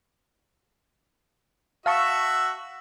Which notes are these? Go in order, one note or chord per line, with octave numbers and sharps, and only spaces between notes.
F#4 E5 F5 A5 C#6 E6